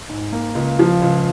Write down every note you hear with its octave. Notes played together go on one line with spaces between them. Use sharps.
G#2
A#3
C#2
F3
C#2